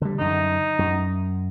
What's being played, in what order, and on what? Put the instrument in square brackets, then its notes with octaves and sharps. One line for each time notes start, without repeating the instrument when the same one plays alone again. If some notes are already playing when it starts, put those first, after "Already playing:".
[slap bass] D3 G3
[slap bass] F#2 D3 [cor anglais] D#4
[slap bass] F#2